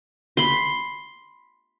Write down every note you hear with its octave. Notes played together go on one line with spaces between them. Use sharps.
B5 C6